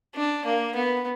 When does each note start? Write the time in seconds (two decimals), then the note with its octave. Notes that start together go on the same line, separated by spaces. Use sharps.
0.15 D4
0.45 A#3
0.75 B3